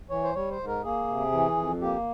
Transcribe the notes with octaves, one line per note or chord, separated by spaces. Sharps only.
E3 C#5
C5
G3 C#5
C5
G#2
A#4
A#3 G#4
C3
E3
F2
A#3 G4